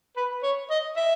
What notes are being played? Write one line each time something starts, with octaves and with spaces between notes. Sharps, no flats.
B4
C#5
D#5
E5